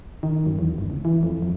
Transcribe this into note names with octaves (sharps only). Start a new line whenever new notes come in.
D#3
F#2
E2
G1
C#2
E3
F2
F2